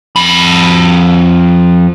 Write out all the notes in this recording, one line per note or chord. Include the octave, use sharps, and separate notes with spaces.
F2 B5